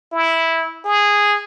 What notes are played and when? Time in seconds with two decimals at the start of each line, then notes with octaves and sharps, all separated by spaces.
0.12 E4
0.85 G#4